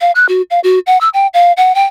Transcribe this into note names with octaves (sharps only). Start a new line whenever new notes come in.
F5
F#6
F#4
F5
F#4
F#5
E6
G5
F5
F#5
G5